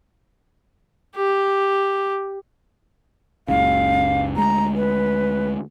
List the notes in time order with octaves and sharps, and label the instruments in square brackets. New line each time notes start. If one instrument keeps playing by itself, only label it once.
[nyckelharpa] G4
[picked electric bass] F#1 C#2 C#3 [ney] F5
[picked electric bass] D2 G#3 [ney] A#5
[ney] B4